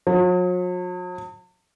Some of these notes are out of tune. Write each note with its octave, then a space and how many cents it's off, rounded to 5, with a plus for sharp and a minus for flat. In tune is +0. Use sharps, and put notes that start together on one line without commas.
F#3 -45